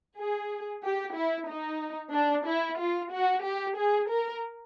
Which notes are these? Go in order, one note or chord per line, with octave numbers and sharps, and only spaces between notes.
G#4
G4
E4
D#4
D4
E4
F4
F#4
G4
G#4
A#4